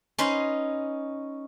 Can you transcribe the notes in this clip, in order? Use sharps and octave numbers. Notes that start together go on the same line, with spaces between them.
C#4 D#4 B4 C6